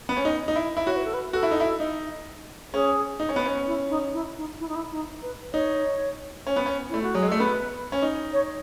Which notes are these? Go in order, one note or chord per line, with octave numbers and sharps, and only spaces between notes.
B3
C#4
D#4
D#4
E4
E4
F#4 C#5
B4
A4
B4
F#4 A4
E4
D#4
E4
D#4
C#4 G#4
D#4
C#4
B3
C#4
E4
D#4
E4
D#4
E4
D#4
E4
D#4
B4
D#4 C#5
C#4
B3
C#4
A3 E4
F#4
F#3 G#4
G#3
A3 A4
B3 B4
C#4
D#4
C#5